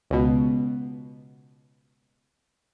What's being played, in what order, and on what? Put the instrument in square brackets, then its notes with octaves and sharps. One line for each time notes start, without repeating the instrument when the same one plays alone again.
[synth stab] C#2 B2